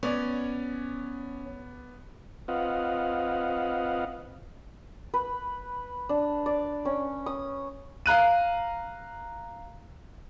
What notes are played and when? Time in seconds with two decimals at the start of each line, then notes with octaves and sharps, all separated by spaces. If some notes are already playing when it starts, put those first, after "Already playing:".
0.03 B3 C#4 C#5 D5
2.48 C4 F4 B4 D#5 F5 F#5
5.14 B4
6.09 D4
6.46 D5
6.85 C#4
7.26 D#6
8.06 F5 A#5 F#6 D#7